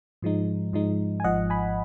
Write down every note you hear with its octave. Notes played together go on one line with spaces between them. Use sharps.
G#2 F3 G#3 D#4
G#2 F3 G#3 D#4
G#5
G#1 G#2 F3 D#5 F#5
G#5 B5